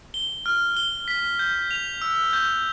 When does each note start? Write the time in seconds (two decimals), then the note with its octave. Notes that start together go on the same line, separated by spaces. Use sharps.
0.14 G7
0.46 F6
0.77 G7
1.08 B6
1.39 G6
1.71 F7
2.02 E6
2.33 G6